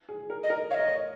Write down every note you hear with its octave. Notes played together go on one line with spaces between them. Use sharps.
G#4
A#4
D#5
A#4
C#5 F5
A#4 D#5
C#5